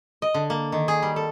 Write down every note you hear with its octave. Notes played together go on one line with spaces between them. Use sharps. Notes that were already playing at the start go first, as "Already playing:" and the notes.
D#5
D3
A#3
D#3
G#4
G3
A4